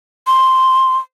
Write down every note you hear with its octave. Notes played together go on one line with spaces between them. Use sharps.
C6